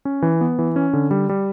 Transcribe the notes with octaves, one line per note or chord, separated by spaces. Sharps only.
C#4
E3
B3
E3
C#4
D3
G3
G3